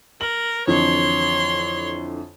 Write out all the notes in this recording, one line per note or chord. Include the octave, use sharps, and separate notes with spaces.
A#4 F#7
F2 D3 E3 C#5 C6